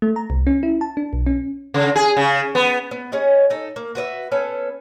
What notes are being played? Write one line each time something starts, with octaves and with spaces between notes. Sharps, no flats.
A3
A#5
C2
C#4
E4
A5
D4
B1
C#4
C#3
G#4
C#3
B3
B3
C#4 G#4 C#5 D#5
D#4 A4
A#3
F#4 B4 D5 E5
B3 C#4 A4